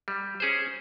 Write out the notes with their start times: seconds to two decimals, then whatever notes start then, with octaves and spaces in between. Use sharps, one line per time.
0.08 G3
0.40 C#4 G#4 C5